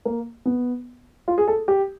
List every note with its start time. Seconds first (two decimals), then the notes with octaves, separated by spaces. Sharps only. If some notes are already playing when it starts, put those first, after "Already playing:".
0.05 A#3
0.45 B3
1.28 F4
1.38 G#4
1.47 A4
1.68 G4